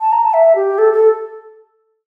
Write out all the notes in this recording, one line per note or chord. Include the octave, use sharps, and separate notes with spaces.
A5
A#5
A5
E5
G4
A4
A4